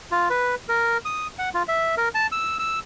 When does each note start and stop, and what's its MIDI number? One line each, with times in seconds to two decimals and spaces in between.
0.11 0.29 65
0.30 0.55 71
0.69 0.98 70
1.05 1.27 87
1.39 1.49 78
1.54 1.63 65
1.68 1.95 76
1.97 2.09 70
2.15 2.27 81
2.32 2.57 88
2.59 2.79 88